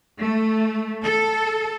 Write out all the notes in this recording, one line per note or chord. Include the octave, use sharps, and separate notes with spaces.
A3
A4